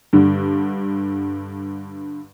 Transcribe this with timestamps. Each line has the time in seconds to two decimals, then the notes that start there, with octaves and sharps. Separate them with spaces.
0.13 G2 D3